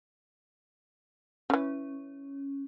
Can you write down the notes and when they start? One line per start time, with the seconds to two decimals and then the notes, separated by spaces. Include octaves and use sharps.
1.50 C#3 E3 C#4